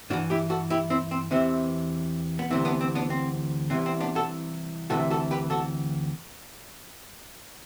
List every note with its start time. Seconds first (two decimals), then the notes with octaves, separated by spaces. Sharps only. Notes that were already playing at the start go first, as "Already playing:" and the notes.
0.10 G2 E3 D4 F#4
0.30 E4 G4
0.50 F#4 A4
0.70 E4 G4
0.90 C4 E4
1.11 C4
1.31 E2 C3 E3 C4
2.39 B3
2.51 D2 C3 E3 C4
2.65 B3 D4
2.81 C4
2.95 B3 D4
3.10 C4
3.70 C2 C3 E3 C4
3.86 C4
4.00 B3 D4
4.15 F#4 A4
4.90 D2 C3 E3 F#4 A4
5.10 F#4 A4
5.31 G4 B4
5.50 F#4 A4